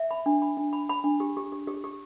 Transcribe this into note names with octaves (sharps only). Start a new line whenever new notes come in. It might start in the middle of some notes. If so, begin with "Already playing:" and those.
Already playing: E5
B5
D4
B5
D4
B5
B5
D4
G4
G4
G4
G4
G4